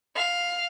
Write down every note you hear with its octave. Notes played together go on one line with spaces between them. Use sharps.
F5